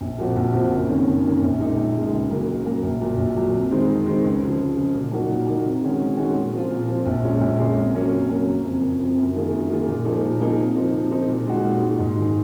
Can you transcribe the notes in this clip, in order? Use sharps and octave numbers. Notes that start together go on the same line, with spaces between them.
A#1
A#2 F3 C4 F#4
A#1
A#2 F3 C4 F#4
F#1
F2 D#3 A#3 C#4
F#1
F2 D#3 A#3 C#4
A#1
A#2 G#3 D#4
A#1
A#2 G#3 D#4
C#2
C#3 F#3 A#3
C#2
C#3 F#3 A#3
A#1
A#2 F#3
A#1
A#2 F#3
F2
D#3 G#3 C4
F2
D#3 G#3 C4
C#2
C#3 F3
C#2
C#3 F3
A#2
F#3 A#3 D#4 F#4
A#2
F#3 A#3 D#4 F#4
C3
D#3 G#3 C#4 F#4
C3
D#3 G#3 C#4 F#4
A#2
F3 C4 F4
A#2
F3 C4 F4
A#1
A#2 G#3 C#4
A#1
A#2 G#3 C#4
F2
C3 F#3 A#3 C#4
F2
C3 F#3 A#3 C#4
F#1
F2 C3 F3
F#1
F2 C3 F3
F#2
D#3 A#3 F4 G#4
F#2
D#3 A#3 F4 G#4
A#2
F3 A#3 D#4 G#4
A#2
F3 A#3 D#4 G#4
C3
F3 C4 D#4
C3
F3 C4 D#4
A#2
G#3 D#4 F#4
A#2
G#3 D#4 F#4
G#2
D#3 G#3 D#4 G#4